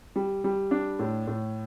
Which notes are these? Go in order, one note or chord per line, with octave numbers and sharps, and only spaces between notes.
G3
G3
D4
A2
A2